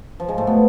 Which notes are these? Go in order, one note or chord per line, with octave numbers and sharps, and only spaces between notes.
F3
G#2 G#3
A2 A3
B2 B3